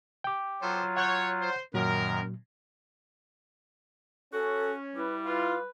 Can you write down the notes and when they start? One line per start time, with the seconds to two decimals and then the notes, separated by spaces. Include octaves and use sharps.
0.24 G5 D6
0.62 F#3 B3 F4 A4 C5
0.96 C#5 F#5 F#6 G6
1.41 C5
1.74 F#2 A#2 D#3 F#3 A#4
4.33 C#4 F#4 A4
4.95 G3 E4 B4
5.26 F4 B4